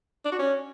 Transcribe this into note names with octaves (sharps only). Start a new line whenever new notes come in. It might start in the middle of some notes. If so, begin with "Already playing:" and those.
D4
F#4
C#4